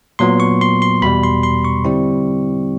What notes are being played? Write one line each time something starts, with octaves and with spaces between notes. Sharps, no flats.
A#2 F#3 B3 C6
C#6
C6
C6
E2 B2 G3 B5
C6
C6
C#6
D3 G3 C4 E4